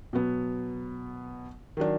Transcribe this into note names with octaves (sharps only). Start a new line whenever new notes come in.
B2 F#3 B3
D#3 F#3 D4